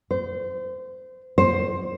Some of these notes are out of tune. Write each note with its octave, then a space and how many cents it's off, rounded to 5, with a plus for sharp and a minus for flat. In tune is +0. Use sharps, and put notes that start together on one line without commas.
C5 -30
C5 +15